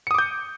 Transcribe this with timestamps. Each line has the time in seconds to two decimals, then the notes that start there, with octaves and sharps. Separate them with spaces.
0.07 C#7
0.11 D#6
0.15 D6
0.18 G6